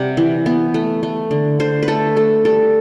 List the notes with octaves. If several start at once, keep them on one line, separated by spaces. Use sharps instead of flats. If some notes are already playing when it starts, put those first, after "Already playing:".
Already playing: C3 G3 F#5
E3
B3
A3
A3
D3
D3 C5
B4
A3 A4
A3 A4
G3 A4